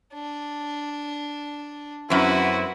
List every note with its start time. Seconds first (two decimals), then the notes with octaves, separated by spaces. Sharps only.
0.14 D4
2.10 F#2 C4 E4 F#4 B4